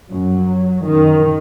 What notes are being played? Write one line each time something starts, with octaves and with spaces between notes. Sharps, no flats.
F#2 F#3
F#2 D#3